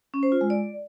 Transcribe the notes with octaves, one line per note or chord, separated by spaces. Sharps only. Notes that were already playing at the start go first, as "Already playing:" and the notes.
C#4
C5
F4
G#3
D5